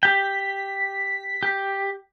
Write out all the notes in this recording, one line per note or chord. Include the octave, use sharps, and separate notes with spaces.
G4 G5 B6
G4